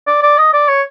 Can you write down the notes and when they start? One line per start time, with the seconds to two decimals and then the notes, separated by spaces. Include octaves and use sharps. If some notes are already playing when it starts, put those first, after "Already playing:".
0.07 D5
0.22 D5
0.38 D#5
0.53 D5
0.68 C#5